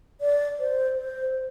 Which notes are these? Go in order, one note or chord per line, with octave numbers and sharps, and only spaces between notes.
D5
C5
C5